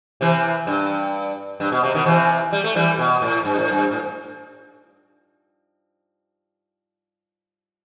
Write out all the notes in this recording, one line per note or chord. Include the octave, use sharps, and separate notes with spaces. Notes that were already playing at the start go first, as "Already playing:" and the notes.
C3 E3
G2
G2
B2
C3
B2 D#3
C3 E3
G3
A3
E3 G3
B2
A2
G2
A2
G2
A2